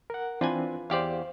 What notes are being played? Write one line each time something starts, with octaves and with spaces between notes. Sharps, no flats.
A#4 F#5
E3 C4 D4 F4 B4 G#5
E2 G4 C5 D5 F5